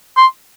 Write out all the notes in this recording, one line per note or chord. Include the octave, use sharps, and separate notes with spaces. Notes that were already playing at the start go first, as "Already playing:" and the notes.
C6